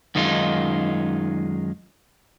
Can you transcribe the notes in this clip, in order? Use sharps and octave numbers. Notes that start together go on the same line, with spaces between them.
F#2 D#3 G#3 D#4 F4